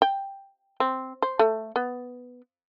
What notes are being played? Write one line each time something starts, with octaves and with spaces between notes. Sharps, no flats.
G5
C4
C5
A3
B3